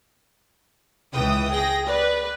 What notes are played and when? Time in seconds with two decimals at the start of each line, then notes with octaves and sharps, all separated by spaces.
1.13 C#2 E3 G5 D#6
1.50 G#4 G5 A#6
1.87 B4 D5